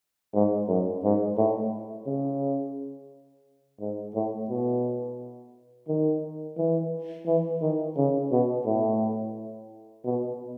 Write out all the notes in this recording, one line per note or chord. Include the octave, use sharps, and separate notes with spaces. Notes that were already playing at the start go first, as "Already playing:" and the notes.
G#2
F#2
G#2
A2
C#3
G#2
A2
B2
D#3
E3
E3
D#3
C#3
B2
A2
B2